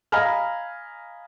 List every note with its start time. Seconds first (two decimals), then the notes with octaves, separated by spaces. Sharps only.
0.12 D#5 F5 G#5 A#5 B5 F6